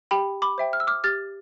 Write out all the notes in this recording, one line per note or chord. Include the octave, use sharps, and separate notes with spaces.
G4 G5 B5
B5 D6
C5 E5 G5
F6
E6
D6 F6
G4 F6 A6